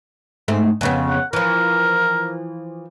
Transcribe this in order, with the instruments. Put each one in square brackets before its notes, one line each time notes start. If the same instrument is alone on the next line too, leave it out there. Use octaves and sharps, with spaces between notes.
[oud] G#2 A3 C4
F2 C#3 B3
[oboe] F#5
[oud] E3 F3 [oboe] A#4